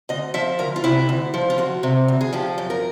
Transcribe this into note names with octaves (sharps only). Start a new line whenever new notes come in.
D2 D#5
F3 E5
D2 A#4
F4
C3 E4
D2
F3
F4
D2 F#4
C3
D2
G#4
F3 G4
F#2
A#4